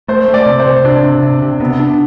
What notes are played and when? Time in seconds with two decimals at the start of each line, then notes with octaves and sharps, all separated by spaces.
0.08 A3 C5
0.28 A3
0.34 D5
0.46 C3
0.60 C5
0.66 C3
0.85 C3 D4
1.04 C3
1.23 C3
1.42 C3
1.60 C3 B3
1.80 D4